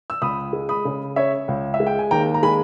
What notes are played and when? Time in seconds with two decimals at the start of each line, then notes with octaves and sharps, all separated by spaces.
0.10 E6
0.22 C#2 B5 D#6
0.53 G#3
0.69 B5 D#6
0.85 C#3
1.16 C#4 C#5 E5
1.48 C#2
1.74 E5
1.80 G#3
1.87 G5
1.99 G#5
2.11 D#2 G5 A#5
2.34 A#5
2.43 G#3 G#5 B5